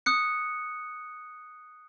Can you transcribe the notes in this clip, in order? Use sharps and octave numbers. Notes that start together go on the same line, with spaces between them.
D#6 F#6 C#7